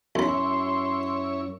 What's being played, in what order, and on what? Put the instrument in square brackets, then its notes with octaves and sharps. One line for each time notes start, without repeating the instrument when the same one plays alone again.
[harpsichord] B1 B5 [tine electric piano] F#2 [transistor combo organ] E4 C#5 [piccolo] C6